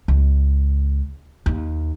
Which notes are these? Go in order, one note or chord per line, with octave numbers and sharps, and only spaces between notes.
C#2
D#2